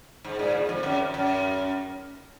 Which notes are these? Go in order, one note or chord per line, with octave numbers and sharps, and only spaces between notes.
G#2
A#2
G#2
F2
F#2
F#2